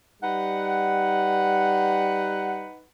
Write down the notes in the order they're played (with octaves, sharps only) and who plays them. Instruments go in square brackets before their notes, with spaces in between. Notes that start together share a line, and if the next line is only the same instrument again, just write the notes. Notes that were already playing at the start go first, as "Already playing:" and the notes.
[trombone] G3 [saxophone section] D#4 B4 F#5